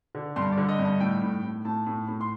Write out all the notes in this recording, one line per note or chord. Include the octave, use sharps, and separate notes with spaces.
D3
G2 C6
D5
D3
D#5
G2
D#5
A2 G5
A2
A2
A2 A5
A2
A2
C6